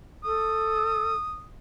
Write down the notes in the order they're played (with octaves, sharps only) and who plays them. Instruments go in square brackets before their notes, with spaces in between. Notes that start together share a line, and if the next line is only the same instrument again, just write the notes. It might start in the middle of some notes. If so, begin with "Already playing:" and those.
[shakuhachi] A4 [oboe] D#6